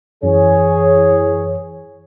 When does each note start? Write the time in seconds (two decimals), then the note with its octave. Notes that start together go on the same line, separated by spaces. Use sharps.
0.23 F#2 E3 G#4 C#5